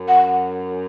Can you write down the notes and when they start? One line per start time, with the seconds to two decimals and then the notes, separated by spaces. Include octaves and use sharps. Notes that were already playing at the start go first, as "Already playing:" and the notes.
Already playing: F#2
0.08 F#5